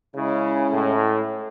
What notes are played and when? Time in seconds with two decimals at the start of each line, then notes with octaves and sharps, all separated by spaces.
0.16 C#3 G#3 C#4 E4
0.71 A2